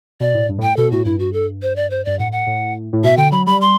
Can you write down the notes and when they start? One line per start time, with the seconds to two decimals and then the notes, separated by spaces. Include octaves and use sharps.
0.20 B2 D5
0.34 A2
0.49 G2
0.58 A2
0.62 G5
0.77 B2 A4
0.91 A2 F#4
1.05 G2 E4
1.19 F#4
1.33 A4
1.62 C5
1.76 D5
1.90 C5
2.05 G2 D5
2.19 A2 F#5
2.32 F#5
2.47 A2
2.93 A2
3.03 B2 E5
3.17 D3 G5
3.32 F#3 B5
3.46 G3 B5
3.61 C6